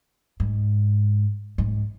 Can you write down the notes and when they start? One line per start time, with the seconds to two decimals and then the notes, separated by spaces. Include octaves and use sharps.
0.40 G#2
1.58 G#2